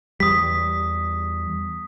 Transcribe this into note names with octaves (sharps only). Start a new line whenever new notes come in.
E2 G3 D#6 B6